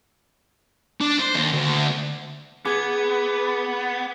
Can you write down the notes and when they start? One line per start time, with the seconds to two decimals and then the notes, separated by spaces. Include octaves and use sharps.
1.01 D4
1.20 C5
1.35 D#2
1.53 D2
2.65 B3 G#4 D6 G#6